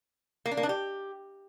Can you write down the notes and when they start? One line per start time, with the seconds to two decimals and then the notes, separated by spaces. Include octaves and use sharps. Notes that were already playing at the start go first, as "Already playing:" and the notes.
0.46 A#3
0.51 D4
0.57 A#3
0.63 D4
0.69 G4